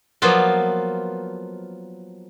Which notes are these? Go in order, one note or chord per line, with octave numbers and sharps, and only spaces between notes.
F3 F#3 A#3 B3 F4